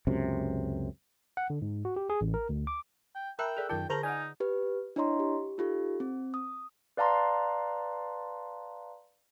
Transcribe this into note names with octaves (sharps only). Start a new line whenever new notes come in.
C#2 F#2 C3
F#5
D3
G#2
F#4
G4
G#4
A1
A#4
D2
D6
G5
A#4 E5 G5 A5 B5 E6 F#6
G#4 A4 D5
F#2 D#3 F4 A#4 G5 A5
D3 G#4 A#4 C5 A5 A#5 G6
D#4 D5 F#5 G#5 F6
G4 B4
D4 E4 C#5 D#5 A#5 C6
G4
D#4 F4 G4 A4
C4
D#6
B4 D5 F5 A5 A#5 C6